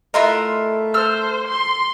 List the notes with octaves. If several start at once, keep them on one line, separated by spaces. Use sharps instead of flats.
A3 E4 F4 A#4 D#5 C6 F#6
A4 C5 E6 F6
C6